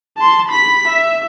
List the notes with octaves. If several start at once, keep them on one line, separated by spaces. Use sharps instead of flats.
A5 C6
B5 B6
E5